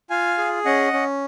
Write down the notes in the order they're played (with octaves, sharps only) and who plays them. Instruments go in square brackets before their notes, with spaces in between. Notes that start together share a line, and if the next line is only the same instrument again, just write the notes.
[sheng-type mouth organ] F4 F5 G#5
G#4
C#4 D#5 F#5
C#4